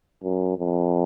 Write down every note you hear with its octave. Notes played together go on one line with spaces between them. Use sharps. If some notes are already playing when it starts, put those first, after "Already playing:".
F#2
F2